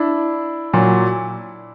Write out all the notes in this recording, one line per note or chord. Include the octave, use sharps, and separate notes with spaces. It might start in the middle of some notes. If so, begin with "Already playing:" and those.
Already playing: D4 E4
A#2 F#3